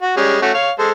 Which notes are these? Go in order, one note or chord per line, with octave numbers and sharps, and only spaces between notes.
F#4
G3 G#3 C#4
A3 C#4 F#4
C#5 F5
G#3 A4 C5